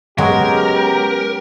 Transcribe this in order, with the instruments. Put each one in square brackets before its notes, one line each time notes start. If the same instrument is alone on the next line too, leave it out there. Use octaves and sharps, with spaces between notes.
[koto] F#3 G#3 [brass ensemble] B3 C#4 G4 [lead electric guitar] A#4